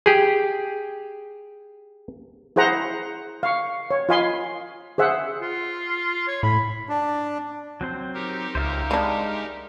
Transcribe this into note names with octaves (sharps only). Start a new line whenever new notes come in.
G4 G#4
E4 G#4 C5 F#5 A#5
F5 C#6
C#5
F4 D#5 F5 G#5 B5 C6
G#4 C5 E5 F#5
F4
C#5
A2 B5
D4
F#3 C4 C5
D#4 G4 A#4
C#2 C5 E5 F5
G3 G#3 D4